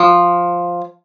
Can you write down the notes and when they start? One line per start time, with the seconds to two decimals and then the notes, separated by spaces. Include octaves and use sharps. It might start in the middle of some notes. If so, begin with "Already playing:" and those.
Already playing: F3